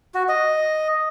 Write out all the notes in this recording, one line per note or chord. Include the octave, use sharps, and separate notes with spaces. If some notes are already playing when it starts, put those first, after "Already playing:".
F#4
D#5